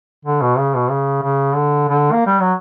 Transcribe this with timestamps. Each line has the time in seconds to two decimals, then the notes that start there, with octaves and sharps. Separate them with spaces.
0.25 D3
0.42 B2
0.58 C#3
0.75 B2
0.90 C#3
1.23 C#3
1.55 D3
1.89 D3
2.12 A#3
2.27 G3
2.40 F#3